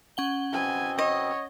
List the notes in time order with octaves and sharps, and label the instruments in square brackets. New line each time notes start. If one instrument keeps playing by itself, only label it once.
[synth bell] C#4 F#5 G7
[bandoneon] B2 B3 C4 [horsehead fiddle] G#5
[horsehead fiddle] C#5 [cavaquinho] D#5